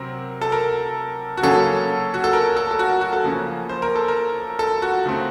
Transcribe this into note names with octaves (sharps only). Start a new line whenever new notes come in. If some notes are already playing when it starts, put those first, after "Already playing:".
Already playing: C3 F#3 C4 A#4
A4
A#4
F#4
C#3 F#3 A#3 C#4 A4
F#4
A4
A#4
A4
A4
F#4
F#4
A4
C#3 F3 A#3 C#4
C5
A#4
A4
A#4
A4
F#4
C#3 A3 C4